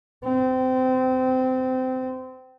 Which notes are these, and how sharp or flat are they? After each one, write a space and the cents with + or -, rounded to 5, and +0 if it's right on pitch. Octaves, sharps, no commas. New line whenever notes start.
C4 -25